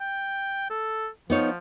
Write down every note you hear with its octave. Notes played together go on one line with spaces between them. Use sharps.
G5
A4
F3 B3 D#4 C#5